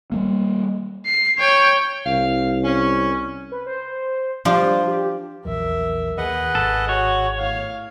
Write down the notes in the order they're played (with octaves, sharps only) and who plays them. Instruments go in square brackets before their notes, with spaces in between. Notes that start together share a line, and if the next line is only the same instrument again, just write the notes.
[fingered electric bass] G3 A3 A#3
[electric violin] C7
C#5 G5
[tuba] C2 [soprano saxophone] F5
[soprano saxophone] C#4
[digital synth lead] B4
C5
[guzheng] F3 D4 F4 [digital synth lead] G3
[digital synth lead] G4
[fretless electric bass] A#1 E2 F#3 [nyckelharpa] A#4 E5
[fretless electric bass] D#2 [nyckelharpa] G#4 [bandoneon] B4 D#5 F#5
[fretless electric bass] G#1 [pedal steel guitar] A4
[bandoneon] F#4 F#5 [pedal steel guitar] C#5
[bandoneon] A2 [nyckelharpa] F5